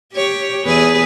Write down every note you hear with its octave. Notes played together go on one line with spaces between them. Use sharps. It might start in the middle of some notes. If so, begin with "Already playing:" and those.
G4 C#5
E2 G#4 B4